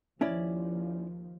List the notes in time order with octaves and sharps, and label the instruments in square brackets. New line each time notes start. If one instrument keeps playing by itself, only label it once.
[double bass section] D#2 F3 [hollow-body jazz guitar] C#4 E4 D5